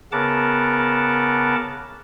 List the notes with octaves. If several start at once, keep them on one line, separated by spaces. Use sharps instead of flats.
C#3 B3 A#4 F#5 A5 D6